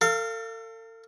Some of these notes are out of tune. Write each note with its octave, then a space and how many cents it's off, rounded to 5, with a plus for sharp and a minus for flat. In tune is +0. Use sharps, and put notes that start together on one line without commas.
A4 +40 F5 -15